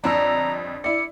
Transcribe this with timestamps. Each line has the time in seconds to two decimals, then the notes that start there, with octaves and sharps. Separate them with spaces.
0.04 G1 F2 D4 A#5 E6
0.84 E4 D5 C#7